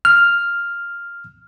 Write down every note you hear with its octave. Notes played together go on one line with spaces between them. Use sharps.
F6